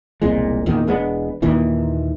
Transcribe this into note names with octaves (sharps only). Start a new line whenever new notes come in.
E1 C2 A#2 G#3
E2 A#2 D#3
E1 G#3 B3 D4
D#2 A#2 D#3 E3